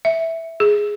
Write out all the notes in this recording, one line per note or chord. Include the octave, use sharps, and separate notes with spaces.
E5
G#4